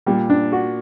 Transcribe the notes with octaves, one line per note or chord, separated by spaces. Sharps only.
A#2 G3
D4
F#4